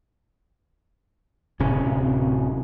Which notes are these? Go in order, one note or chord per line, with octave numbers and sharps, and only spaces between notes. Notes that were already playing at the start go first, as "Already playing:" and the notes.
D1 C3 C#4